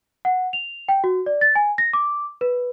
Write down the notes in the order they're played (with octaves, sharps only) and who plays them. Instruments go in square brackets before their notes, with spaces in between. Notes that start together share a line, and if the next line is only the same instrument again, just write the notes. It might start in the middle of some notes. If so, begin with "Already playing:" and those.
[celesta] F#5
F7
G5
F#4
D5
A6
G#5
A#6
D6
B4